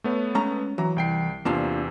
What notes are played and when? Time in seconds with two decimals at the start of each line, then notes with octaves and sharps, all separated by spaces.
0.04 A3 B3 C#5
0.35 G#3 C#4 A#5
0.78 E3 F#3 A#5
0.96 C2 G5 C7
1.45 E2 C3 A#3 D4 F4